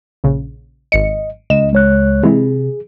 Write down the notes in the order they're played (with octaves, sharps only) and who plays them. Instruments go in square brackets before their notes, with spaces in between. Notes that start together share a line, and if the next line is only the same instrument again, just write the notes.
[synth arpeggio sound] A#1 C#3
[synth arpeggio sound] G#1 C#7 [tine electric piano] D#5
[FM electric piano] C#2 [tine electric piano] D#5 [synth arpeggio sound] E7
[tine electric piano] G#3 C#5 F#6
[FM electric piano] C3 [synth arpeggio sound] E3 G#3 E4 [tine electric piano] G#4